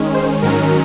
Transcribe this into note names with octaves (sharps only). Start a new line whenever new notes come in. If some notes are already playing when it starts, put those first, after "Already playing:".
Already playing: D#3 G#3 C#4
C5
G#2 D#3 F#3 C#4 A#4